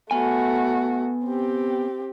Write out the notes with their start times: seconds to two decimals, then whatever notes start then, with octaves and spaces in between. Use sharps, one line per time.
0.11 A3 B3 F#4 G#5
1.26 C4 G4